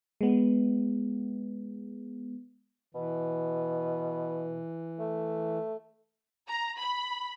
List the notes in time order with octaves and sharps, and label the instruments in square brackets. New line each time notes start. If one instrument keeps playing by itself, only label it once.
[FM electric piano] G#3 B3
[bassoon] B2 [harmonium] E3
[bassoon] A3
[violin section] A#5
B5